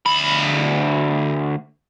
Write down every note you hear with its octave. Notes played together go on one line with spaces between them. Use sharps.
D2 B5